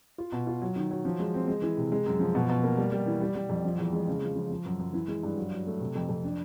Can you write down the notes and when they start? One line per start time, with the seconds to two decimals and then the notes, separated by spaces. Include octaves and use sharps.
0.18 F4
0.32 B2
0.47 F4
0.62 F#3
0.76 D#3
0.91 F#3
1.05 F3
1.19 G#3
1.34 C4
1.48 G#3
1.62 E3
1.77 C3
1.92 G#3
2.06 F#2
2.20 F3
2.35 B2
2.49 B2
2.63 A#3
2.77 G3
2.92 G3
3.06 E3
3.21 G3
3.35 G3
3.49 F2
3.65 F3
3.78 E2
3.93 G#3
4.08 C#3
4.22 F3
4.36 F3
4.51 F3
4.65 F#2
4.80 F#2
4.93 E3
5.08 G#3
5.23 G2
5.37 F#3
5.52 F#3
5.67 A3
5.80 C3
5.95 F2
6.09 F2
6.24 D4